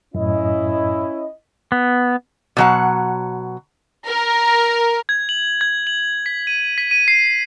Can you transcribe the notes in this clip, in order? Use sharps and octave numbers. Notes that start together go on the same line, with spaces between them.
F#2 A2 C#4 E4 D#5
B3
B2 F#3 F#5
A#4
G#6
F#7
G#6
F#7
B6
D#7
B6
D#7
C7